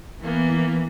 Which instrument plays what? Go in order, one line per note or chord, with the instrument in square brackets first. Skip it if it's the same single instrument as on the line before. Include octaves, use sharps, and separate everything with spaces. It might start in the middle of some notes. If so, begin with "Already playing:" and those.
[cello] E3 [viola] A#3 B3